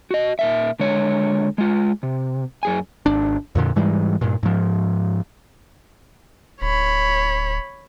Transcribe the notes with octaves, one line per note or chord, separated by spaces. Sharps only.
F#4 D#5
A#2 A#4 E5
D3 G#3 C#5
G#3 F4
C3
F#2 G#4 G#5
G#1 D4
F2 A#2 D3
G#2 E3 G3 G#3
G2 A#2
G#2 F3
D1 C#5 B5